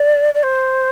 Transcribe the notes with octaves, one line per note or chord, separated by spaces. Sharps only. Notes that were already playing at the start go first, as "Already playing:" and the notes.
Already playing: D5
D5
C5